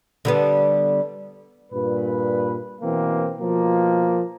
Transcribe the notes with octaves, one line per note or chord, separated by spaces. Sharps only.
D3 G3 B3
G2 A#2 B4
B2 E3 A#3 C4
B2 F3 A#3